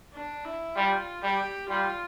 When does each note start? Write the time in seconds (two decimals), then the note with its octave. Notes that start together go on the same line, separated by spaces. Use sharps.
0.14 D4
0.45 E4
0.76 G3 F4
1.23 G3 G4
1.69 G3 F4